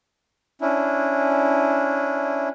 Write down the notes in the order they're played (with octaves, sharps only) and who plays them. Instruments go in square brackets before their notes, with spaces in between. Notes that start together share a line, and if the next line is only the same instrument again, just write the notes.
[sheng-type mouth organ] C#4 D4 E4